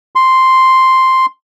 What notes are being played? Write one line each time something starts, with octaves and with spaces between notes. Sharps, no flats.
C6